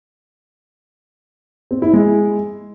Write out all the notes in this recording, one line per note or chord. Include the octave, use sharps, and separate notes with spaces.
C4
E4
G#3